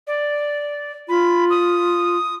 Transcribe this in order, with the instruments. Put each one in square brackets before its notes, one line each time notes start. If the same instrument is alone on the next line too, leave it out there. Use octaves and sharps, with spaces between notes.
[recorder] D5
[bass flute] F4 [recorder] B5
[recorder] D#6